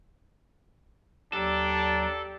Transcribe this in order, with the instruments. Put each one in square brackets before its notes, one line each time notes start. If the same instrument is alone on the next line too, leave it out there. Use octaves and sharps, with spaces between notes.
[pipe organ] D#2 F#3 A#5 [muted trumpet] D4 [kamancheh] G4 D5 [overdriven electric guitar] A4